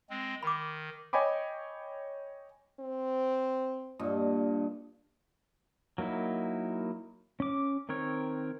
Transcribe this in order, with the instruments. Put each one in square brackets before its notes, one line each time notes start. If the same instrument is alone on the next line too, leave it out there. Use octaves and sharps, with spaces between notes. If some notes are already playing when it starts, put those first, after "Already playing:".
[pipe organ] G#3 C4
[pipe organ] D#3 [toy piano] B5 D6
[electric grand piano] C#5 D#5 G5 G#5 B5 D6
[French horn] C4
[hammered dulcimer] G2 A#2 D#5
[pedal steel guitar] F#3 A#3 D#4 E4
C#4 D6
D#3 C4 A#4 C#5